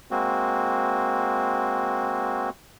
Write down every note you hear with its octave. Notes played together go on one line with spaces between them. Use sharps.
G#3 A#3 C4 F#4